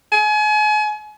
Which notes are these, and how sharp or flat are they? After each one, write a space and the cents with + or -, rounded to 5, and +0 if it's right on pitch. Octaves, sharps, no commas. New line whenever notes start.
G#5 +35